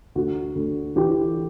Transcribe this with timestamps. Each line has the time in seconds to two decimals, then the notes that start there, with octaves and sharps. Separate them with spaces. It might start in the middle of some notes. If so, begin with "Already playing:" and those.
0.15 D2 F#4
0.55 D2
0.96 E3 G4